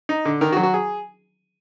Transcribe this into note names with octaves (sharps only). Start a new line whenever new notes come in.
D#4
D3
D#3 A#4
F#4
F#3
F#4
G#4